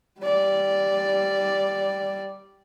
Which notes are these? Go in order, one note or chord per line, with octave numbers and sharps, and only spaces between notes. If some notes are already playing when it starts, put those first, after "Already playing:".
G3 D5